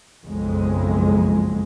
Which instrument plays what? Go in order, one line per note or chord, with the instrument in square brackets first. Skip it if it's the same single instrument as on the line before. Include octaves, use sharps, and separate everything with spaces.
[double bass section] F#1 B1 F2 G#3